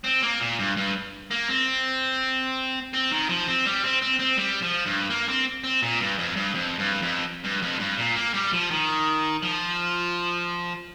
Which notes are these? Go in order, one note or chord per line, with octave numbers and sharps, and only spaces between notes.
C4
A#3
A#2
G2
G2
A#3
C4
C4
D#3
F3
C4
G3
C4
C4
C4
G3
F3
G2
A#3
C4
C4
A#2
G2
F2
G2
F2
G2
F2
G2
F2
G2
A#2
A#3
G3
F3
D#3
F3